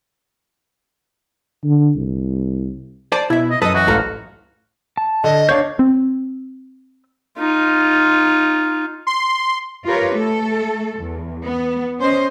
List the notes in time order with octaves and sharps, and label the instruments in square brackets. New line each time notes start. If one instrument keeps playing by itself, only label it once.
[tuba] D3
C2
[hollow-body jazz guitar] C5 G#5 A5 [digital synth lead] D5
[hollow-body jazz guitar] B2 E5 [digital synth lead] E4 [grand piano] G#6
[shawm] D#5
[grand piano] F#2 [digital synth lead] A4 [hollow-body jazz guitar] B4 D#5 [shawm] D#6
[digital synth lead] E3 [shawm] F#4
[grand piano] A1 F5 F6 [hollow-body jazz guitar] G#2 A4 A#5
[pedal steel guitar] A5
[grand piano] D3 [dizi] D#5
[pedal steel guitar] D3 F5 G6 [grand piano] D4 C#5
[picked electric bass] C4
[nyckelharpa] D#4 F4
[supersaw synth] C6
[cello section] F4 G4 A#4 B4 C#5
A3 A4
E2
B3
C#4 C5 D#5